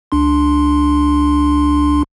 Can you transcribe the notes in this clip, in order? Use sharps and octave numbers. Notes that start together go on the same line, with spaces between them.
C#2 D4 C6